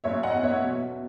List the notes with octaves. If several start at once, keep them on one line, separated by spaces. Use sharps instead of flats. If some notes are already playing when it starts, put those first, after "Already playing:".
F#1 C#5 E5
D#5 F#5
E2
C#5 E5
B2